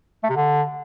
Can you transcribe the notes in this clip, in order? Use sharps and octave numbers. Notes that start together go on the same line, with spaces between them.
A3
C3
D3